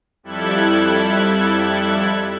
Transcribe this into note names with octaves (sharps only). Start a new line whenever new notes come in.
F2 G3 E4 A4 F#6 G#6